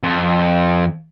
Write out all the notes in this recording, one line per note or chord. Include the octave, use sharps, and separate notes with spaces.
F2